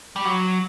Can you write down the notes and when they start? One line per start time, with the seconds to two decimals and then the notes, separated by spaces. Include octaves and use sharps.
0.16 G3
0.25 F#3